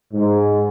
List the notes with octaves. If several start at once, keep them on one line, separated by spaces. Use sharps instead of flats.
G#2